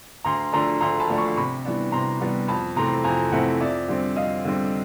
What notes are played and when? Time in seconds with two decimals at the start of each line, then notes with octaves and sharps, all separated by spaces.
0.24 D2 A#5 C6
0.53 D3 F3 A3 D4 A#5 C6
0.81 D2 A#5 C6
1.00 A5 B5
1.09 D3 F3 A3 D4
1.18 B5 C#6
1.36 C3 B5 C#6
1.65 E3 G3 B3 D4
1.92 C3 A#5 C6
2.20 E3 G3 B3 D4
2.48 F2 A5 B5
2.76 C3 E3 A3 C4 A#5 C6
3.04 F2 G#5 A#5
3.32 C3 E3 A3 C4 E5 F#5
3.61 F2 D5 E5
3.88 D3 G3 C4
4.16 F2 D#5 F5
4.45 D3 G3 C4